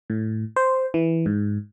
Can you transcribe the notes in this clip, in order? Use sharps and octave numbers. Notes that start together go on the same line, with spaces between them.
A2
C5
E3
G#2